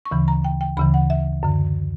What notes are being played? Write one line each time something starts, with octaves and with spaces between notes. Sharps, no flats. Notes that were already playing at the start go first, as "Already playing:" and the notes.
C#6
D2 C#3 E3 B5
A#5
G5
G5
D2 C#3 E3 B5
F#5
E5
F#2 D3